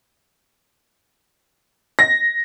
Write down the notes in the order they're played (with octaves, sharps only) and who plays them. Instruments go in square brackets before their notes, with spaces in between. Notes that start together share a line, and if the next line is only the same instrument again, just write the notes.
[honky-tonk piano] A#6